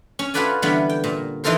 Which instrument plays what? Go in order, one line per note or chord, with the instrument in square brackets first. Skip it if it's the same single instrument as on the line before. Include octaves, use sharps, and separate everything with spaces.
[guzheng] C#4
F4 F#4 A4 B4 D5 G#5
D3 E3 G3 B3 C#4
G5
A#2
E3 D#4 F4 A4 A#4 C5